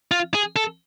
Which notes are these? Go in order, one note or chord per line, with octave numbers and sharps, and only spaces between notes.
F4
G#4
A4